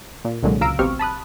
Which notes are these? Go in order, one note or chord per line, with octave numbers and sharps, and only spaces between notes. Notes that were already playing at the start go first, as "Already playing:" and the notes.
A#2
C2 A#2 D3 F#3 G#3
C#2 F5 A#5 E6 D7
A1 B2 C4 G4 C#6 F6
A5 B5 D#6 F#6